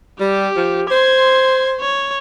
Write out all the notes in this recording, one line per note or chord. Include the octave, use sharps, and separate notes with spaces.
G3 G4
F3
C5 C6 G#6
C#5